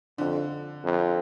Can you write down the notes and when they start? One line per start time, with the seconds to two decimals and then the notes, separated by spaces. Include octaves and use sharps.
0.18 F2 D3
0.84 F2